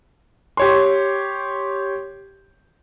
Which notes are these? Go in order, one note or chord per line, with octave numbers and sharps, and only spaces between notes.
G4 C#5 C6